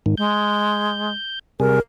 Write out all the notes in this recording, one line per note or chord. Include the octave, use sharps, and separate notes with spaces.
G#2 D#3
G#3 G6
C3 G3 G#4 A#4